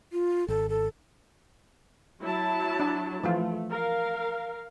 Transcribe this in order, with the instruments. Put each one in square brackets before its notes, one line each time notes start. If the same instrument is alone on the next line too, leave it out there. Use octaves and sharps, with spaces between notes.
[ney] F4
[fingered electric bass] G#1 [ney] A4
[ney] A4
[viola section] F#3 E4 A5
[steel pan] D4
[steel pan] E3 F3 F4 [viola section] A3
[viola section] A#4 F5